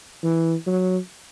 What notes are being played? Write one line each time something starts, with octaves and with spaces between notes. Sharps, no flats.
E3
F#3